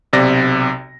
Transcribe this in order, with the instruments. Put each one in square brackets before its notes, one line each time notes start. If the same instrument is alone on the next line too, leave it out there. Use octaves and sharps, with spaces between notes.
[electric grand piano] B1 C3 D5 A#6